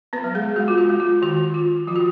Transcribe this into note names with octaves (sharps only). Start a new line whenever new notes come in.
B3 B4
F#3
G#3 G#4
G#3 F#4
F4
F#4
G#3
F4
D#3 F#4
F4
F3 F4
F#4